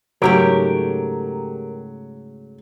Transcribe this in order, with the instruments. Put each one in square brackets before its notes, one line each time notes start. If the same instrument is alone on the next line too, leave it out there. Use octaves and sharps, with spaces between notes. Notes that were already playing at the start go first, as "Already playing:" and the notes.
[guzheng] G#2 C#3 A3 [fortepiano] F#3 [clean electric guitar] G4 A#4